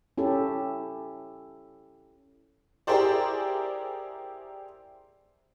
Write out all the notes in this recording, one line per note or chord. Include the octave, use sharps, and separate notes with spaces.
C#4 E4 G4 A4
E4 G4 G#4 A#4 C5 D5